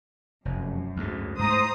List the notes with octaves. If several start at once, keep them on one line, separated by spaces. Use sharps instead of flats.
F1 F#2
D2 G#2
G#2 A3 C5 A#5 D#6